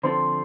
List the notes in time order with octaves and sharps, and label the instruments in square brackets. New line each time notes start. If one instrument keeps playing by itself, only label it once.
[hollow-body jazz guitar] D3 F3 C4 F4 A4 [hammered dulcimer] C5